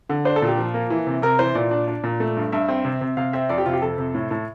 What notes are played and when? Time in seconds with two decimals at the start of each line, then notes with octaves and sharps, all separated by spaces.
0.09 D3
0.25 D4 C5
0.36 A4
0.42 A#2
0.47 G4
0.58 F3
0.74 A#3
0.90 E3
1.07 C3
1.22 C3 A#4
1.39 E3 C5
1.55 A#2 D5
1.71 D4
1.88 D4
2.04 A#2
2.20 A3
2.37 G2
2.52 G2 E5
2.69 C4
2.85 C3
3.01 C3
3.17 C3 F5
3.33 C4 E5
3.49 F2 D5
3.58 G4
3.66 C3 F4
3.74 G4
3.82 F2 A4
3.98 C3
4.15 A2
4.31 A2